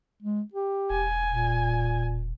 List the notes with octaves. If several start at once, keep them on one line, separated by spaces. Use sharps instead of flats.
G#3
G4
E1 G#5
A#2